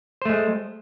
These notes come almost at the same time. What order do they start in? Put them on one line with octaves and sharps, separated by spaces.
C5 A3 G#3